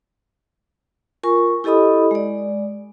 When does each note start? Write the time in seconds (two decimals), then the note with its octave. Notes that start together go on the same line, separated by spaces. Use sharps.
1.23 F4 A#4 G#5 C#6
1.64 E4 G4 A4 D#5 B5 D#6
2.11 G#3 D5